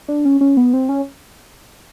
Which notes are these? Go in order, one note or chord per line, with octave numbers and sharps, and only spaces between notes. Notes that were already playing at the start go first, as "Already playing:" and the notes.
D4
C#4
C#4
B3
C4
C#4